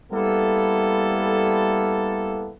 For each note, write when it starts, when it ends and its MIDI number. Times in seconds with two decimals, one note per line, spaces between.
0.12 2.51 55
0.12 2.51 58
0.12 2.51 59
0.12 2.51 64
0.12 2.51 69